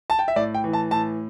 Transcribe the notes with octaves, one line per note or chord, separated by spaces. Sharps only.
A5
G5
E5
A2 D5
G5
E3
A5
A2 A5